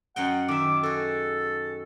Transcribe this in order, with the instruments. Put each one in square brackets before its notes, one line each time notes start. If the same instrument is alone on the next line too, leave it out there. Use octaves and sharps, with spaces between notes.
[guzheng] F#2 D#5 G5 [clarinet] F#5
[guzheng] D#3 E5 [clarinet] D6
[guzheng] F#4 G#4 [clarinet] A4